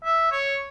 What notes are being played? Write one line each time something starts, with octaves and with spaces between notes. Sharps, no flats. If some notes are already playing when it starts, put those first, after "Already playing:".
E5
C#5